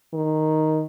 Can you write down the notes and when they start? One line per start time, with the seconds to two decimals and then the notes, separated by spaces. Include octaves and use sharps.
0.14 D#3